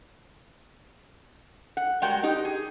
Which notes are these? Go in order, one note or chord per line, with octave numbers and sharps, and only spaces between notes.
F#5
G3 G#3 F#4 A#4 F#5 G5
D#4 G4
G#4